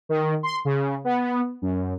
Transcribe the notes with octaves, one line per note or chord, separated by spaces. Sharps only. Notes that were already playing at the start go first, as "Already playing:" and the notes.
D#3
C6
C#3
B3
F#2